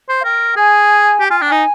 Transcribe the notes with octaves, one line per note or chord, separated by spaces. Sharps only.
C5
F5
A#4 G5
G#4 G#5
G4
F4 G#5
D4 G5
D#4 G#5